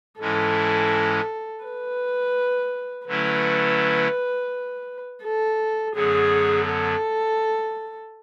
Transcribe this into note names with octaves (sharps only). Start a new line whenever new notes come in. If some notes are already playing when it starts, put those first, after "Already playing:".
G#2 E3 G#3 C#4 E4 A4
B4
D3 F#3 A3 C#4 E4 B4
A4
F#2 D3 F#3 B3 G#4
A4